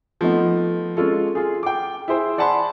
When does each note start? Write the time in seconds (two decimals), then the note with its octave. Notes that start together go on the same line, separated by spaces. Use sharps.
0.21 F3 A3 B3 D#4
0.97 G#3 C#4 F4 A4
1.35 F4 G#4
1.63 G5 D6
2.08 E4 G#4 C5
2.38 D5 F#5 G#5 A5 B5 C6